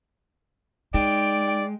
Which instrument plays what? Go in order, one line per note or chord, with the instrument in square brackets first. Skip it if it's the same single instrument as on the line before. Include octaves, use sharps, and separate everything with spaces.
[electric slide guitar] G#3 [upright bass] D#4 [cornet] D5 [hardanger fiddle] G5